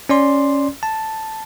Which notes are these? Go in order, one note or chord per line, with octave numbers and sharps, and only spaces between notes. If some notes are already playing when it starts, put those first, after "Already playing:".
C#4 D5 C6
A5